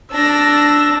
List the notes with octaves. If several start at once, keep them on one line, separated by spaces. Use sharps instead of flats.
D4 A5 E6 A#6